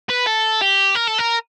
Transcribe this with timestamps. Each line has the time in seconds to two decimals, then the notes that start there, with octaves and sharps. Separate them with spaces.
0.10 B4
0.27 A4
0.61 G4
0.95 A#4
1.07 A4
1.18 A#4